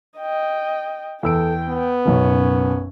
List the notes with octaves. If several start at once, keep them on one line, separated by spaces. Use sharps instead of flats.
D#5 G5
E2 A4 G5 E6 D7
B3
F#1 B1 F#3 C#4